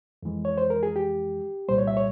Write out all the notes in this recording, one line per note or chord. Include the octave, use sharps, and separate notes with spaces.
F2 E3 G#3
C#5
C5
A#4
G#4
G4
C2 A#2 G3 C5
C#5
E5
C#5